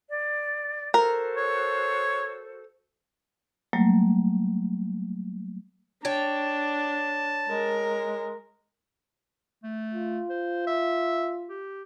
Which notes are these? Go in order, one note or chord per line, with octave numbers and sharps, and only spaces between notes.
D5
F#4 A4 A#4 C5
C#5
F#3 G3 A3 A#3
D4 C#5 G5 A5
G#3 A#4
A3
F4
C5
E5
G4